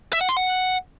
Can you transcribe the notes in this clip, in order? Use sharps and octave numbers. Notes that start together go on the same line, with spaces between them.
E5
F#5
C6
F#5